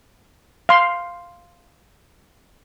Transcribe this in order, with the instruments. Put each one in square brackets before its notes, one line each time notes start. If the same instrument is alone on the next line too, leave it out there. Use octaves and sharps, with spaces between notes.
[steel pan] F5 C6